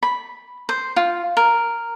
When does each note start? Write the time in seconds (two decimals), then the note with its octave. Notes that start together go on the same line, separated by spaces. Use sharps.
0.03 B5
0.69 C5
0.96 F4
1.37 A#4